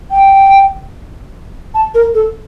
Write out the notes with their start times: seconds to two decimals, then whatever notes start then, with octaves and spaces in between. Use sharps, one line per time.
0.11 G5
1.74 A5
1.94 A#4
2.14 A4